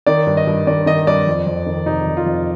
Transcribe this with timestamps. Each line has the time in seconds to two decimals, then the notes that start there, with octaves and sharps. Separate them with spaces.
0.07 D#3 D5
0.27 G2
0.37 D#5
0.47 G2
0.67 D#3 D5
0.86 D#3 D#5
1.07 G2 D5
1.27 F2
1.47 F2
1.66 D#3
1.86 C3 D#4
2.07 F2
2.17 F4
2.26 F2